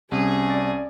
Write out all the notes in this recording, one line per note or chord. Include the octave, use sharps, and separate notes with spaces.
C2 C#4 G#4
D5